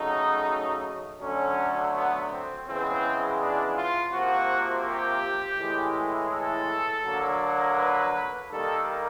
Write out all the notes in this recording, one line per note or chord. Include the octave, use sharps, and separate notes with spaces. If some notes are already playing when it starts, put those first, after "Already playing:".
Already playing: C#3 F#3 A3 D#4
D3 F#3 A3 C#4
B3
C4
C#3 E3 G#3 B3 C4
D4
F4
C3 F3 A#3 F#4
G4
A2 E3 G#3
A4
D3 F#3 A#3
B4
D#3 G3 A#3 A4